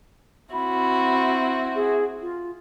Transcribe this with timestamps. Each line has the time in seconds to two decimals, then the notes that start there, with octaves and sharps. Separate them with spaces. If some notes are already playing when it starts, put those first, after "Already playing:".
0.54 C4 E4 F#4 B5
1.75 G#4
2.22 F4